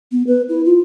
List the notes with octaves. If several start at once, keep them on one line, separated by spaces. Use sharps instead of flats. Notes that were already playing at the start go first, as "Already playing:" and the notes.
B3
B4
E4
F4